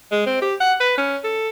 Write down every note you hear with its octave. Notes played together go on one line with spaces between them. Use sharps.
G#3
C4
G4
F#5
B4
C#4
A4